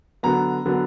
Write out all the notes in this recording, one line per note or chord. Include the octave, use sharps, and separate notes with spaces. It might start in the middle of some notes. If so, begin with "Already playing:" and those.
D3 F#3 B3 A#5
D3 F#3 B3